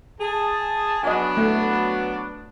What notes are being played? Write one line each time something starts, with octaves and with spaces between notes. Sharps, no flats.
G#4 A5
F#3 B3 D4 D#5 G#5
A3